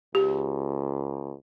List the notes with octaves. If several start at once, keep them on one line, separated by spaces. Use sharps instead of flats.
C#2 G4